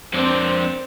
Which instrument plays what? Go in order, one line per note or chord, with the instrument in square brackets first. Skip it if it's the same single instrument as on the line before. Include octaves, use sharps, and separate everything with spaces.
[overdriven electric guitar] F2 D4 [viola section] C4